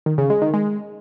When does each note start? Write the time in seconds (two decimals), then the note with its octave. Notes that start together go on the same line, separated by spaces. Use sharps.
0.06 D#3
0.18 C#3
0.30 G#3
0.42 D#3
0.54 G#3